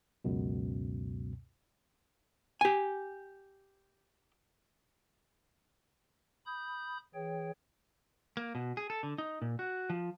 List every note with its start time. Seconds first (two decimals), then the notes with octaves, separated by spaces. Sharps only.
0.24 C#2 F#2 B2
2.61 G4 G#5
6.46 B5 D#6 G6
7.15 E3 G#4 C#5 G5
8.37 A#3
8.55 B2
8.77 G#4
8.90 A4
9.03 D3
9.18 D#4
9.42 A#2
9.59 F#4
9.90 F3